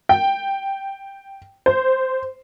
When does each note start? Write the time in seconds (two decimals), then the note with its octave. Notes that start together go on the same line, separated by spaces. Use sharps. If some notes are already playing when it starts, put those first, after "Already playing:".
0.09 G5
1.66 C5